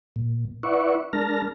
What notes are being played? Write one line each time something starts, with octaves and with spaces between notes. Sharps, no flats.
A#2
E4 B4 D5 E5 F#5 C#6
G#3 D4 A#4 A5 F6 A#6